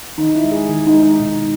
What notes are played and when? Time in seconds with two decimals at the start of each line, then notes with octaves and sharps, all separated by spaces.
0.18 D#3 D#4
0.35 E4
0.44 G#3
0.52 G#4
0.69 D#3
0.87 D#4
0.94 G#3
1.03 D#4
1.20 B2